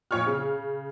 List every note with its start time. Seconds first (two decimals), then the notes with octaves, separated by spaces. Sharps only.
0.11 F2 A#2 C#5 C#6 F6
0.26 C#3